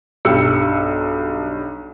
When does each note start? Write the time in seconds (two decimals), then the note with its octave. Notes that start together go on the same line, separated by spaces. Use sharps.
0.25 B1 G2 G4 E6 C#7